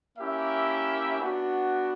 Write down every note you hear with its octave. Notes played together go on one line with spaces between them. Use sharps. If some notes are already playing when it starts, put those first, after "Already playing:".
A#3 C#4 E4 G4 E5
B3 D4 F#4